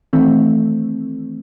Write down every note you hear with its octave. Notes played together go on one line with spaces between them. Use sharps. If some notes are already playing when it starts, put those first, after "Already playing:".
D#3 E3 A3 C4